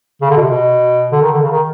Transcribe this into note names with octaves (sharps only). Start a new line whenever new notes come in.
C#3
D3
B2
C3
B2
D3
D#3
D3
C#3
D#3